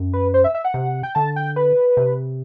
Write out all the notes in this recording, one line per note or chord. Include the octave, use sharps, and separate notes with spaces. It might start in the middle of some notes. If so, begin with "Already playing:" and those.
Already playing: F#2
B4
C5
E5
E5
F#5
C3
G5
D3 A5
G5
B4
C3